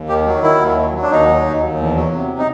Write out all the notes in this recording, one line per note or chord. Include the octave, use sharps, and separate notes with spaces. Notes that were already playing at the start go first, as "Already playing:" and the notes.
Already playing: D#2
D#3 G4
F#3
D#3 E4
D#2
F#3
F#3
D4
D#2 D#4
F#3
D#2
D#2
E2
F#3
C3
D#4